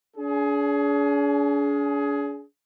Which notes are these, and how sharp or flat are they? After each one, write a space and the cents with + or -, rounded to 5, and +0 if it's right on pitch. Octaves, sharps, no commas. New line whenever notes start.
D4 -45 G#4 +20